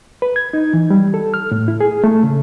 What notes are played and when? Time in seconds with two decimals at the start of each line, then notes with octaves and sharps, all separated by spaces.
0.22 B4
0.36 G#6
0.53 D#4
0.73 E3
0.90 G3
1.14 A4
1.34 F6
1.51 A2
1.68 E4
1.81 G#4
2.04 A3
2.24 C#3